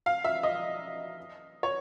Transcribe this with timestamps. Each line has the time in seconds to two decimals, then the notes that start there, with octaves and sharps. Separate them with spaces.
0.06 F5
0.24 E5
0.43 D#5
1.63 C#5